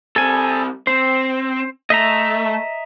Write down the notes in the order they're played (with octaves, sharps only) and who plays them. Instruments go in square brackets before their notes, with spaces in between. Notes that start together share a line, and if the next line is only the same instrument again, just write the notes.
[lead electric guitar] G3 C4 [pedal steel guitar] A4 G#5
[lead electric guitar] C4 [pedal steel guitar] C5
[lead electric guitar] A3 [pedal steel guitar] D#5 E5 A#5